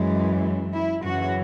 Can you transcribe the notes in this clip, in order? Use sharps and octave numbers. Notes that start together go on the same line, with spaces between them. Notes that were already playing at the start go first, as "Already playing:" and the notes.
Already playing: F#2 E3 G#3
E4
F#2 C#3 E3 F#4